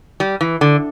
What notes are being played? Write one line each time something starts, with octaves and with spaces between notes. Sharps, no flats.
G3
E3
D3